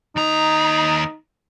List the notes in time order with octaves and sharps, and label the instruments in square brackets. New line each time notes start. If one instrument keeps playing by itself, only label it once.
[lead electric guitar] D#2 A#5 [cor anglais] D#4